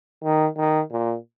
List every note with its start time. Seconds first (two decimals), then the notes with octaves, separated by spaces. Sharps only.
0.23 D#3
0.57 D#3
0.92 A#2